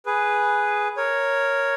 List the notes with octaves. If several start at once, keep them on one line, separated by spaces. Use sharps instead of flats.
G#4 B4
A#4 C#5